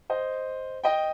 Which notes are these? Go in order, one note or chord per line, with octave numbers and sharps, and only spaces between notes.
C5 D#5
D#5 G5